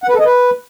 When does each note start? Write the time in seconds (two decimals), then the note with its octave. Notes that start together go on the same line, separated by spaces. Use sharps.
0.04 F#5
0.09 B4
0.14 A4
0.20 D#5
0.25 B4